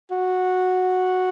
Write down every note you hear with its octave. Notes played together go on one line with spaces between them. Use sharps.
F#4